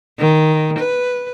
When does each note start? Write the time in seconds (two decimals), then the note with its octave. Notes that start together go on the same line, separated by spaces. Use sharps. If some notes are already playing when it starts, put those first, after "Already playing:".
0.19 D#3
0.79 B4